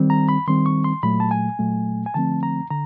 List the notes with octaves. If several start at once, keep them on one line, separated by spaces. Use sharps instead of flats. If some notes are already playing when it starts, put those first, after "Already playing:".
Already playing: D#3 G3 C4
A#5
B5
D#3 G3 C4 C6
C#6
C6
A#2 F#3 A3 B5
A5
G#5
A#2 F#3 A3
G#5
D3 F3 A3 C4 A5
A#5
D3 A#5